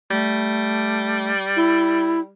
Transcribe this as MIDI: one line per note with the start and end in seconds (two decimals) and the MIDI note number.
0.11 2.32 55
0.11 1.32 57
1.56 2.20 64